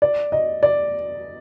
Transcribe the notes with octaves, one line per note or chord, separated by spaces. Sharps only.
D5
D#5
D5